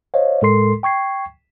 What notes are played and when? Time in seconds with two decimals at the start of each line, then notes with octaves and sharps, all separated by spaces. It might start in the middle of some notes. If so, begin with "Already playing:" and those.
0.14 C5 C#5 D#5 F5
0.42 A2 G#3 A4 A#4 C6 C7
0.83 G5 C#6 G#6 C7